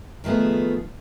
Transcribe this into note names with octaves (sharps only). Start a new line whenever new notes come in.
D#3 F3 A3 B3 G#4